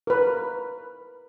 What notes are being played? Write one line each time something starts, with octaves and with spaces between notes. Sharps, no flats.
A#4 B4